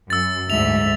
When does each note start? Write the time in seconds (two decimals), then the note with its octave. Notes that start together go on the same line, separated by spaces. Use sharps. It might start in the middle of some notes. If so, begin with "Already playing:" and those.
0.10 F#2 E6 A6
0.50 D2 G#2 E5 F7